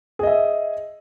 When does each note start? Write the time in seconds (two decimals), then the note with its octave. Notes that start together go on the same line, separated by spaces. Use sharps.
0.19 G#4
0.23 D#5
0.27 E5